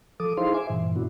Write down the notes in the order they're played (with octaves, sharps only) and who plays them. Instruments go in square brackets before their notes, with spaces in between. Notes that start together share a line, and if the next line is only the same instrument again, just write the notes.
[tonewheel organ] F3 A4 D6 D#6
D#4 E4 G#4 C5 F5 C6
E5 G#5 C6 D6
G2 A#2 E3
B3 D4 E4 F#4